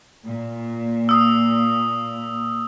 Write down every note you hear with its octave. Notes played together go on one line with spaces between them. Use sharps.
A#2
D#6 E6